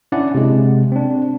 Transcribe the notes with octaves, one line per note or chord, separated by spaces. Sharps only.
C#4 D4 E4 D5 F#5
C3 G#3
C4 D4